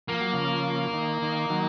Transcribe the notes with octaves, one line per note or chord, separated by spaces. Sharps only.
F3 A#3
F#3
C#3 F3
D#3
D#3
D#3 F#3